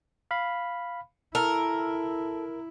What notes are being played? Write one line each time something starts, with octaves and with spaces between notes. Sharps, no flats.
F5 B5
E4 A4 A#4